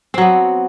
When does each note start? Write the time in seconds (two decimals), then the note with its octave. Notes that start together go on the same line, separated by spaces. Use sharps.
0.14 C4
0.18 F#3
0.22 B3